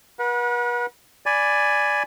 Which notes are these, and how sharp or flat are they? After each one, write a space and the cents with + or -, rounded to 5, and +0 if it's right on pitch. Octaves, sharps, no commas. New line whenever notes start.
B4 -40 F#5 -25
D5 +0 G#5 +0 B5 +10